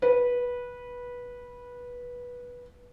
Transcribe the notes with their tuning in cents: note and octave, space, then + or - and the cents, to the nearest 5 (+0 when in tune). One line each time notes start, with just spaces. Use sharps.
B4 -15